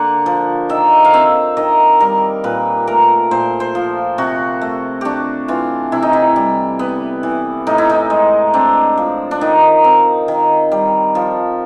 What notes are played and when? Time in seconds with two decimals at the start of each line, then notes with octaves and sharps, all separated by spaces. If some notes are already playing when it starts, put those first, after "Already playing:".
Already playing: D3 A#3 F#5
0.26 F3
0.69 D#3 E5
1.05 F5
1.14 C4 E5
1.57 D#3 D#5
2.00 G3 A#4
2.44 A#2 B4
2.87 A3 A#4
3.31 A#2 C5
3.60 C5
3.75 F3
4.18 C3 F#4
4.62 A3
5.01 D4 F#4 G4
5.48 E3 F4
5.92 C3 E4
6.02 D#4
6.13 E4
6.36 G3
6.79 B3
7.23 E3
7.67 A2 D#4
7.78 E4
7.90 D#4
8.10 G#3
8.54 C4 D4
8.97 F3
9.31 D4
9.41 D#3 D#4
9.84 C4
10.28 D#3
10.72 G3
11.15 F3